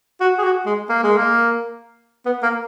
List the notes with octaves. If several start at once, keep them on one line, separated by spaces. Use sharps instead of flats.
F#4
G#4
F#4
G#3
A#3
G#3
A#3
B3
A#3